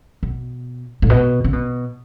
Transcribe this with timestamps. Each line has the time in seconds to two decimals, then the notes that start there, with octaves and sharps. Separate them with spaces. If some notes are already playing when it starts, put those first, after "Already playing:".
0.23 B2
1.02 A2
1.10 B2
1.44 C#3
1.53 B2